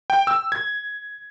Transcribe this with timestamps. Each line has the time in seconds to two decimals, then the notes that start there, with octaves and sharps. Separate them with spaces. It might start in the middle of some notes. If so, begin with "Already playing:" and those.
0.10 G5
0.27 E6
0.52 G#6